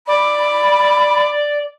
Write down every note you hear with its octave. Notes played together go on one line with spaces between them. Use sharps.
D5 B5